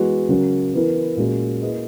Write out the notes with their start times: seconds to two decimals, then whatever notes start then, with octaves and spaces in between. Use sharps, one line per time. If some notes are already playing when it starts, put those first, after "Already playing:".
Already playing: E3 G#3 B3 F#4
0.29 C#3 F#3 C#4 F#4 A#4
0.74 E3 B3 E4 A#4
1.17 A#2 G#3 C#4 F#4 A#4
1.62 A#3 E4 G#4 B4 D#5